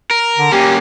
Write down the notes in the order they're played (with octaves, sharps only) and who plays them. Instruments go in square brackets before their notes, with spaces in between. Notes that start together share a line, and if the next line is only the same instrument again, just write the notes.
[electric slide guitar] A#4
[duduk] D3
[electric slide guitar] A#3 C#4 [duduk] G4